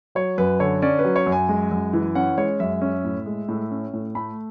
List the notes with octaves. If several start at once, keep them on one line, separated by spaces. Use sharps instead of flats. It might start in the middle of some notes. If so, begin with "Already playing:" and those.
F#3 C#5
F#2 B4
D3 C#5
C#4 D5
B4
F#3
C#5
F#2
G#5
G#3
F#2
E3
C#4 F#5
G#3 C#5
F#2 E5
C#4
A2
G#3
A2
C#4
A2
A3 B5